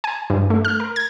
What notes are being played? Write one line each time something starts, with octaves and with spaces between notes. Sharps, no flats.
G#5
G2
A3
F6
A#4
G#6